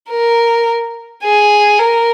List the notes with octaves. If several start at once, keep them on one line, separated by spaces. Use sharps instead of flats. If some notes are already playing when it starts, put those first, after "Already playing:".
A#4
G#4
A#4